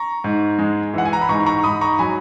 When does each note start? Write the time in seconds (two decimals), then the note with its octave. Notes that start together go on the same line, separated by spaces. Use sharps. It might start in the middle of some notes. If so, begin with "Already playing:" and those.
Already playing: A#5 C#6
0.24 G#2
0.59 G#3
0.94 E3 F#5
1.05 G#5
1.13 A#5
1.21 B5
1.29 G#2 A#5 C#6
1.46 A#5 C#6
1.64 G#2 B5 D#6
1.81 A#5 C#6
1.99 F#3 G#5 B5